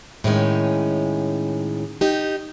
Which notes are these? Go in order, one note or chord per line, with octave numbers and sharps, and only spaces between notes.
A2 D#3 G#3 C#4
D#4 G4